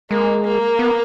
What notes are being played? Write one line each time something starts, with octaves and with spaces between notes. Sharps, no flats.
G#3 A#3
A#3
B3